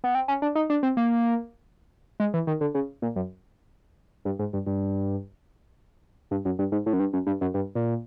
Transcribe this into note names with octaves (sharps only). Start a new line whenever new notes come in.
B3
C4
C#4
D4
D#4
D4
C4
A#3
G#3
E3
D#3
D3
C#3
A#2
F#2
G2
G#2
G2
G2
G2
F#2
G2
G#2
A2
F#2
G2
F#2
G2
F#2
G2
A#2